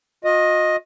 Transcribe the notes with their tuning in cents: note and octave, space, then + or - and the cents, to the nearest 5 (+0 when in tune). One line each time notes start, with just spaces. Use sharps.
F4 +45 D#5 +0